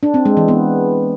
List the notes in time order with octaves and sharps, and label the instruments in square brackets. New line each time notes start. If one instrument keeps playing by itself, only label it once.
[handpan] D4
C4
G#3
E3
B3